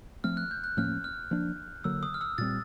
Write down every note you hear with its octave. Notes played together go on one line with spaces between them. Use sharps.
F3 A3 C4 F6
F#6
G6
F#6
A2 F3 A#3 C#4 F6
F6
F3 A#3 D4
D3 F#3 A#3 E6
D#6
F6
E6
A#2 G3 C4 A6